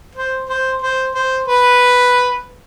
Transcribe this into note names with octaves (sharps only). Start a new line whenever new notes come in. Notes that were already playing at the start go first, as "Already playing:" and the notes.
C5
C5
C5
C5
B4